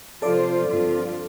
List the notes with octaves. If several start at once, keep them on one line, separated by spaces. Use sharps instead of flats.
C3 F3 C4 F4 A4 C5 D5
G2 D3 F3 C4 F4